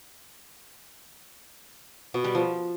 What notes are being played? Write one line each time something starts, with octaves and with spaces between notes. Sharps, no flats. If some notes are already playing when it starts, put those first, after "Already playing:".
B2
G3
F3